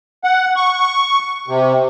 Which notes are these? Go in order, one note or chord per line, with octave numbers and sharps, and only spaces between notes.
F#5
C#6
C3